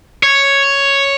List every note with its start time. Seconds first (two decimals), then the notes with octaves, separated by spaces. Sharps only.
0.23 C#5